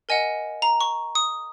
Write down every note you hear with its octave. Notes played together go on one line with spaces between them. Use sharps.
A#4 D#5 F#5 G#5
A#5
C#6
D#6